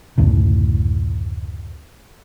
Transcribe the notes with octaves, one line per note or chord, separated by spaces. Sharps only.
F#1 D2 A2 C#3